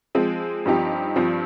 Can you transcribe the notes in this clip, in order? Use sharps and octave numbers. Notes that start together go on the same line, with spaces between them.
F3 G#3 C4
G2 F3 C4 D#4 G4
G2 F3 C4